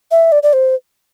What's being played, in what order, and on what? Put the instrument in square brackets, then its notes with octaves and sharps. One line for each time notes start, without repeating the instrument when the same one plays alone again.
[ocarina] E5
D5
D5
C5